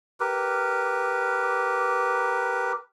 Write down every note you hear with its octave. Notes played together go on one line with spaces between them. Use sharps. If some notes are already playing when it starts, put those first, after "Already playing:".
G4 A#4 B4